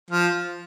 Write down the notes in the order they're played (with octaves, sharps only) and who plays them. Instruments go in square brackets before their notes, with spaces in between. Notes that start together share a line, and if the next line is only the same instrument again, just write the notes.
[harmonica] F3